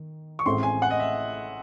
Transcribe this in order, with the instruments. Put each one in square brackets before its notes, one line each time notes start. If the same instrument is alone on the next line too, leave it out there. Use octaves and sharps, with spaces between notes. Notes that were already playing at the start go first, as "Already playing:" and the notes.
Already playing: [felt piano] D#3
[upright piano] C#6
[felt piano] A1 A2 G#3 C4 [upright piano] C6
[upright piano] G#5
F#5
D#5
E5